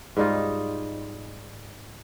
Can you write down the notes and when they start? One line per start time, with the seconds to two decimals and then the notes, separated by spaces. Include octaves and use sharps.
0.17 G#2 G3 D#4 F4